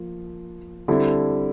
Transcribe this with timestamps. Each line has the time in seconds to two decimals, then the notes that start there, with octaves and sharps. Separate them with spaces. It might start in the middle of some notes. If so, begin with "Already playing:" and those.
Already playing: F3 A#3
0.88 D3 G3 C4 E4 A4